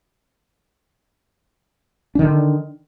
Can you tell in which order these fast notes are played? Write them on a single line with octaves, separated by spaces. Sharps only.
D4 D#3 D3